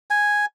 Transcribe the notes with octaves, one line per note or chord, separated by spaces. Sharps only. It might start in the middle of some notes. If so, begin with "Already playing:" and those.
G#5